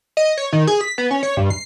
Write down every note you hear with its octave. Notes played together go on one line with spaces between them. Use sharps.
D#5
C#5
D#3
G#4
B6
B3
C#4
C#5
G2
C7